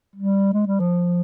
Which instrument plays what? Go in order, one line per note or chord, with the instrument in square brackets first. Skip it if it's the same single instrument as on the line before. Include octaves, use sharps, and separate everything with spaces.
[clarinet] G3
G#3
G3
F3